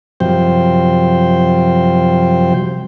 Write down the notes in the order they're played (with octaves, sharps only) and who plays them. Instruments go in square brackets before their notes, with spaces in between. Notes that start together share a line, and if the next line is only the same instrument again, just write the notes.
[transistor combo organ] F#2 C3 F3 G3 C5 G5